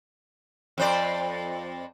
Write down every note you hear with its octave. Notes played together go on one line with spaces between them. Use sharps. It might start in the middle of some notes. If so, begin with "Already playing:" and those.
F2 C5 D5